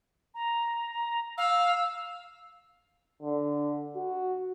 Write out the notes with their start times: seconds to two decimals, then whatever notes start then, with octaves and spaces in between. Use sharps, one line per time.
0.34 A#5
0.92 A#5
1.38 F5 E6
3.22 D3
3.96 F#4